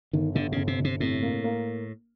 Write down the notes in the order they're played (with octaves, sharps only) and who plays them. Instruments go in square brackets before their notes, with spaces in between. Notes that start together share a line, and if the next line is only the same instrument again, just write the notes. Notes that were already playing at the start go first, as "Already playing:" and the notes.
[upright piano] G1 [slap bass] D#3
[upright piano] G1 [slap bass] D3
[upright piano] G1 [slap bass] C#3
[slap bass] C3
[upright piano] G1
[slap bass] C3
[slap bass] A2 [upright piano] C3
[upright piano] A#3
A#3